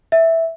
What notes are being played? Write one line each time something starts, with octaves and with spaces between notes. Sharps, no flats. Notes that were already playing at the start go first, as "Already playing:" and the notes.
E5